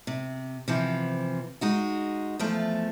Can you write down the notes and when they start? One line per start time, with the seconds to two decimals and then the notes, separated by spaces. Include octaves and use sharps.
0.07 C3
0.68 C3 E3 F3
1.61 G#3 D#4 F#4
2.39 E2 F3 A3